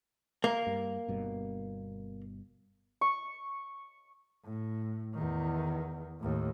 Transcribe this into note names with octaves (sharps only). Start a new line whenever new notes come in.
A#3
G2
G1 G2 B2
C#6
A2
E2 D#3
D#2 A2